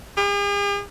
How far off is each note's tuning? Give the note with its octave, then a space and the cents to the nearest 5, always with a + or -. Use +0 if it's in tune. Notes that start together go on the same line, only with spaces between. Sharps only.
G#4 -45